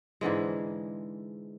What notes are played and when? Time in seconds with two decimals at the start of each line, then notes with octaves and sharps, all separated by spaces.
0.21 G#2 D3 E3 G#3